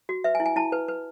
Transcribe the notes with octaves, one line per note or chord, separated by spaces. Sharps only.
F#4
B4 E5
G#5
E4
G#5
E4 A5
B4
B4